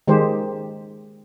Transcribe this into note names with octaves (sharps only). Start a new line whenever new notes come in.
D#3 G#3 G4 C5